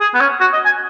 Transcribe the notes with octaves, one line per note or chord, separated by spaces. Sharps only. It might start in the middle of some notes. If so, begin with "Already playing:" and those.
G#4
B3
C#4
F#4
D#5
G#5